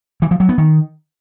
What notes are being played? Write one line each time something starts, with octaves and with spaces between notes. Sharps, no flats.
E3
F3
F#3
B3
D#3